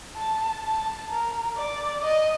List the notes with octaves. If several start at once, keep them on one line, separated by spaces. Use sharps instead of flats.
A5
A5
A#4
D5
D#5